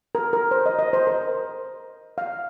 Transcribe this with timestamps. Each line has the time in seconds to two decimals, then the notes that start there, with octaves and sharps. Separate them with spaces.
0.15 A#4
0.33 A#4
0.51 C5
0.66 D#5
0.79 D#5
0.93 C5
1.07 A#4
2.18 F5